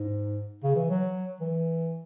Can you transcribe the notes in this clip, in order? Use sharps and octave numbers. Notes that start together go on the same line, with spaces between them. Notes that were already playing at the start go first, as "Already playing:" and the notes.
Already playing: G#2
C#3
E3
F#3
E3